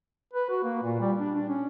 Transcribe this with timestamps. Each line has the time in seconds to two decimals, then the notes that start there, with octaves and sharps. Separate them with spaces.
0.34 B4
0.50 F#4
0.64 A#3
0.83 A#2
1.00 G3
1.20 D4
1.35 D4
1.49 C#4